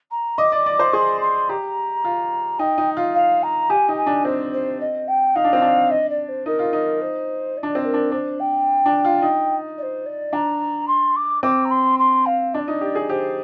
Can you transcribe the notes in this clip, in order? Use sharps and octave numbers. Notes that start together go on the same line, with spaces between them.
A#5
D#5 D6
D5
D5
C5
G#4 C6
C6
G4 A#5
F4
D#4 G5
D#4
F4
F5
A#5
G4 G#5
D#4
G#5
D4
C4 C5
C5
D#5
G5
D#4 F5
D4
C4
D4
D#5
D5
C5
D#4 A#4
F4
D#4
C5
D5
D4
C4
A#4
D4
D4 C5
G5
D4
F4
D#4
D5
C5
D5
D4 A#5
C6
D6
C4 D6
A#5
C6
C6
F5
D4 D5 D#5
D#4
G4
G#4
G4 C5